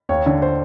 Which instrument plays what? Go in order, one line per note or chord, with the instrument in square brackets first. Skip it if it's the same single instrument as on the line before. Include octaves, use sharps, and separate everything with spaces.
[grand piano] D#2 C#5
D3
C5